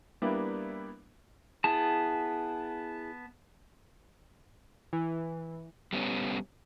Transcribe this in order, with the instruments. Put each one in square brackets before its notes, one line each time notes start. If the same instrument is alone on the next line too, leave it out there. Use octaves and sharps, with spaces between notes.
[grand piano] G3 A#3 B3 D4 E4
[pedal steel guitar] B3 A5 [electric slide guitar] E4 G#4
[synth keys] E3
[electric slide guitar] G3 B3 C#4